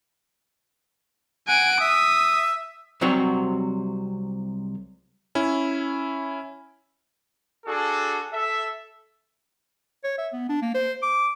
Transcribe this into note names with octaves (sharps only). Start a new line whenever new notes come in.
F#5 G#5 D7
E5 D#6
C2 C3 F#3 C4 F#4
C#4 E4
D4 F#4 G#4 A4
A4 E5
C#5
E5
B3
D4
A#3
C5
D6